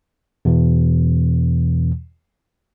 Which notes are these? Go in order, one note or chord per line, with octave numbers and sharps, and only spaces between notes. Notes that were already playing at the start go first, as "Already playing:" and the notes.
E2 B2 E3